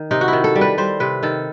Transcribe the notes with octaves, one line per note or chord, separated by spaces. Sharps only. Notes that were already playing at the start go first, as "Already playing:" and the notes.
Already playing: D#3
C3 D#4
F#4
D#3 E4
A4
G3
B4
G3 C5
C3 B4
D#3 A4